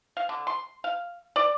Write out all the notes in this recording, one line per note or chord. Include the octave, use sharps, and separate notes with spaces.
F5
D3
C6
F5
D5